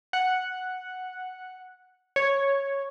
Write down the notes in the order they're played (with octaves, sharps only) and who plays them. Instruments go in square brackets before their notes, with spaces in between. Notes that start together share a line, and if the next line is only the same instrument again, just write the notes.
[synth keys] F#5
C#5